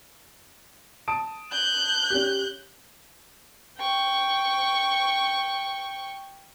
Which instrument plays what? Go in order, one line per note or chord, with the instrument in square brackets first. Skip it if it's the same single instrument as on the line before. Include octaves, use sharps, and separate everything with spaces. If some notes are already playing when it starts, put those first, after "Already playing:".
[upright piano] A5 D#6 D7
[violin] F#6 G6
[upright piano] C#4 G4
[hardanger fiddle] G5 C#6